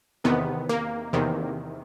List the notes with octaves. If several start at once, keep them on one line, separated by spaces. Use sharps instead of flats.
E2 C3 D#3 B3
A#3
E2 C3 D#3